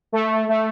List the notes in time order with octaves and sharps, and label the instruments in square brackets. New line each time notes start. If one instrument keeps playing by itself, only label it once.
[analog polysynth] A3
A3